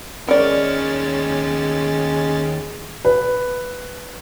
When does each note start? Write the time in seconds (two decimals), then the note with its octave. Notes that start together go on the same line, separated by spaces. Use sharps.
0.28 D#2 G#3 C#4 A#4 C#5 D5 A6
3.05 B4